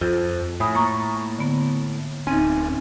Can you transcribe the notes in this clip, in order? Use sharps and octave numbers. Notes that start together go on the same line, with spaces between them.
F2 F4
A2 G#5 B5 D#6
A#3 A#5 C#6
D3 B3
D1 C4 C#4 D#4